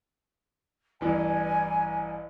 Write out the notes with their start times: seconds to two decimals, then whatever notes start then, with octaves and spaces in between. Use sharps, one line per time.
1.01 A1 G2 E3 G#5